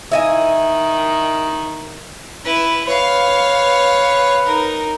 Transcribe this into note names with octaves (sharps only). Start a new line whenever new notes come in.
D#3 E4 D#5 G#5
E4 B4
B4 C#5 F5
D#4 A#4